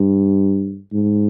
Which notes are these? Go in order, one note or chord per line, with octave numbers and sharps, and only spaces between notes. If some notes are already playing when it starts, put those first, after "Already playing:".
Already playing: G2
G#2